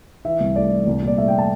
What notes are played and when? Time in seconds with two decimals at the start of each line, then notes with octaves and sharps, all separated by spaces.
0.25 E3 E5
0.40 C2
0.56 A3 D5
0.71 E3
0.87 C2
1.02 A#2
1.08 D5
1.17 A3 E5
1.28 G5
1.38 A5